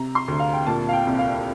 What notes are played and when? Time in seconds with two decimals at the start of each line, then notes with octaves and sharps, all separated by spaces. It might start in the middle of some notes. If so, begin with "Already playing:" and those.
Already playing: C3 A#5
0.15 C6
0.28 D2
0.40 F5
0.53 G5
0.67 A#2 A5
0.89 F5
0.93 G5
1.07 C2
1.19 F5